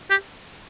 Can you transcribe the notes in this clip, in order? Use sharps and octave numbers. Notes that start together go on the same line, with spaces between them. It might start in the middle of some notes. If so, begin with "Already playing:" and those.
G4